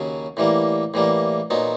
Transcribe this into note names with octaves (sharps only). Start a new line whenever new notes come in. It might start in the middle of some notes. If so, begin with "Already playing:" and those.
Already playing: D#2 C#3 F#3
A2 E3 G3 A#3
A2 E3 G3 A#3
A#2 F#3 B3 D#4